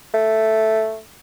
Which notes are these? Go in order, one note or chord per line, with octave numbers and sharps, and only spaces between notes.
A3